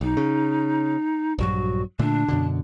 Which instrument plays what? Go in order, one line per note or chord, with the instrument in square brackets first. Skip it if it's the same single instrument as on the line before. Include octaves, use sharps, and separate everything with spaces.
[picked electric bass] B1 [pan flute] D#4
[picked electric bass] C#3
[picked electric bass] A#1 G2 F#3 [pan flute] F#4
[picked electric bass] A#2 D3 A3 [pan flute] D4
[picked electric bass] F#2 B2 D3